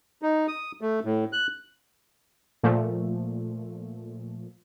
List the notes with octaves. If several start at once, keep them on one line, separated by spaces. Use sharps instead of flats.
D#4
D#6
A3
A2
F#6
A#2 F3 A3